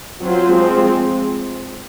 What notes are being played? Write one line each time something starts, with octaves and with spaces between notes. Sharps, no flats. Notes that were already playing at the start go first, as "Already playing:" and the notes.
F#3 C4 F4 C5
F3 G#3 C4